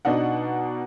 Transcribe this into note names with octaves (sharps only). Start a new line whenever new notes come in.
B2 D4 D#4 F#5